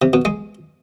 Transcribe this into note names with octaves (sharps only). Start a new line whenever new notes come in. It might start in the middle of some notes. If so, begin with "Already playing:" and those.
C3
B2
G#3